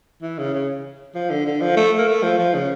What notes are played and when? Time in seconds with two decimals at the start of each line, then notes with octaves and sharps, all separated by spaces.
0.22 E3
0.39 C#3
0.54 C#3
1.15 F3
1.30 D3
1.46 D3
1.62 F3
1.77 A3
1.98 A#3
2.08 A3
2.23 F3
2.38 F3
2.54 C#3